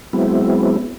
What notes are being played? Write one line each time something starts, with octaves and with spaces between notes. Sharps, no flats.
F#3 G#3 B3 C4 E4